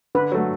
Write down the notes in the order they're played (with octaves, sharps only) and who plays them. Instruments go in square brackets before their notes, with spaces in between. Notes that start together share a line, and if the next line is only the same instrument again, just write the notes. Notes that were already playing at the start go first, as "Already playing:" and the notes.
[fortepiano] D3 [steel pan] B4
[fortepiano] F#3 A3